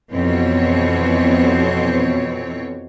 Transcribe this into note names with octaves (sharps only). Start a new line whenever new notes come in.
F2 B2 E3 C4 C#5